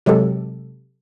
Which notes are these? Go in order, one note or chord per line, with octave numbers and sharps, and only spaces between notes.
C3 F#3 G#3 G4 A4